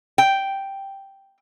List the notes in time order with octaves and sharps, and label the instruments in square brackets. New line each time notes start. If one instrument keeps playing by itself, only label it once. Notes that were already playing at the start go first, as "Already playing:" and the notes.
[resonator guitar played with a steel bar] G5